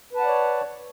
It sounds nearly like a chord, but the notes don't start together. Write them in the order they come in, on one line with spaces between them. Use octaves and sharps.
B4 A5 F#5 D5 C#5